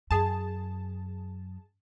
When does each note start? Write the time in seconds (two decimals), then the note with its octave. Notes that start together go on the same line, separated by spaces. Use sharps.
0.11 F#2 G#4 A5